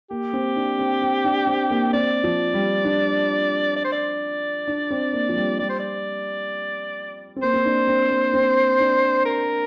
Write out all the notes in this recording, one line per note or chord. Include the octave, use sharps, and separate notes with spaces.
A#3 G4
C4
D4
C4
C4
D4
C4
A#3
C4 D5
F3
G3
D4
D5
C5
D5
D4
C4
A#3
F3
G3
G3 D5
C5
D5
C4
A#3 C5
C4
D4
C4
A#3
C4
D4
A#4